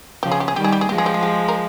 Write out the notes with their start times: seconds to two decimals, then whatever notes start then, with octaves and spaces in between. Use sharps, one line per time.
0.23 C#3 F3 G4
0.32 G#4
0.40 G4
0.48 G#4
0.56 D#3 G3 G4
0.64 G#4
0.72 G4
0.81 G#4
0.89 F3 G#3 G4
0.98 G#4
1.06 G4
1.14 G#4
1.23 G4
1.48 A#4